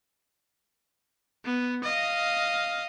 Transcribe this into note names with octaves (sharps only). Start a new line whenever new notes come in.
B3
D#5 F5